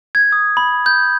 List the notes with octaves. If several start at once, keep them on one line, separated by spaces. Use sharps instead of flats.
G#6
D#6
B5
G6